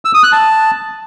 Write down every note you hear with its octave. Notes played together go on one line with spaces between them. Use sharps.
E6
D#6
F#6
A5